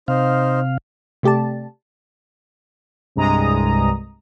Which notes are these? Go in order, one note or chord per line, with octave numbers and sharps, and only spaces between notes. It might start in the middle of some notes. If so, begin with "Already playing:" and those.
C3 D#4 C5 F5
C3 A3 G4 D5 A5
C2 G2 G#3 A#5 D#6